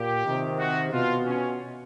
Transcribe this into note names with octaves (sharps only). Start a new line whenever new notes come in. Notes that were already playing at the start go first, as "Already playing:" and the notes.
Already playing: A#2 G4
C3 D#3
F#4
B2 F4
C#4